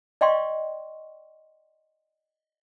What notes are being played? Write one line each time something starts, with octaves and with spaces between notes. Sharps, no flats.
D5 D#5 F5 G5 C6 C#6